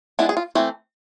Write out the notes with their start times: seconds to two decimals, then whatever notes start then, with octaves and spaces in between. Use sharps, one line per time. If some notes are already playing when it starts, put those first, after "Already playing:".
0.19 G#3 B3 D4 E4
0.29 G#4
0.37 F4
0.55 E3 A3 C4